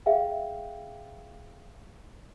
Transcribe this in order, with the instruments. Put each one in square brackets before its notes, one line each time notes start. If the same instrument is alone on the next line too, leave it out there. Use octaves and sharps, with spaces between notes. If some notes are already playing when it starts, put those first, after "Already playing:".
[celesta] G#4 E5 F5 G5